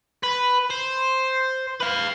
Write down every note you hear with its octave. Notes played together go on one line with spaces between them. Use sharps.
B4
C5
B4 F5